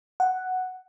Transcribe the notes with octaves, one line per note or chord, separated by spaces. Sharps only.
F#5